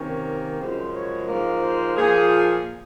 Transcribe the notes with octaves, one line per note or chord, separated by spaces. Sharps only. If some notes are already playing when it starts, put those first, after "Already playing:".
Already playing: C3 D#3 A#3 C#4
F#2 C#3 F3 G#3 C5
C#5
G#2 F3 A#3
C5
A#2 F3 A#3 G#4